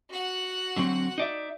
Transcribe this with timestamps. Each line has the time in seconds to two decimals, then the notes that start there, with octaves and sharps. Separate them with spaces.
0.10 F#4 F#5
0.76 D3 F#3 C4
1.18 D#4 D5 E5